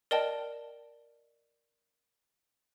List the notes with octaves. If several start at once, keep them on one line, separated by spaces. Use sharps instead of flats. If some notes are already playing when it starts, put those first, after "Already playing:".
A#4 D5 D#5 G5 A5